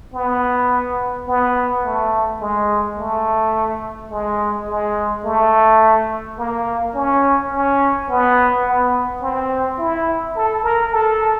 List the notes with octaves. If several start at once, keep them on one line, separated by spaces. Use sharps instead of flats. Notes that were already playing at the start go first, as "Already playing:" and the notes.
B3
B3
A3
G#3
A3
G#3
G#3
A3
A#3
C#4
C#4
B3
B3
C4
E4
A4
A#4
A4